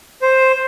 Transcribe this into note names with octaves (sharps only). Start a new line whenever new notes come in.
C5